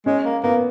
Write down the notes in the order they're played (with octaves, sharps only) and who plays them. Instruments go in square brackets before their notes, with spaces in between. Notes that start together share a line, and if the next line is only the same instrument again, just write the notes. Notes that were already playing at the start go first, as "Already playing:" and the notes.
[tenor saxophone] G#3 [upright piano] C#4
[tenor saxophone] A#3
[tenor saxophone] A#3 [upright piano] B3